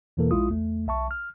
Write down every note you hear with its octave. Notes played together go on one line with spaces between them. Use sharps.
E2 B2 E3 A#3 A4 A#4
A#1 G#3 E4 F4 D#6
E2 A3
B1 E5 A5 C#6
F6